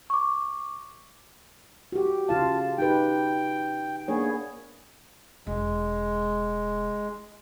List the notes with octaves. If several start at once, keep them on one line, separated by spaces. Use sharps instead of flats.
C#6 D6
F#4 G4
C#3 F4 F5 A5
D#4 G4 B4 G5
A#3 B3 D4 G#4 C#5
E1 G#3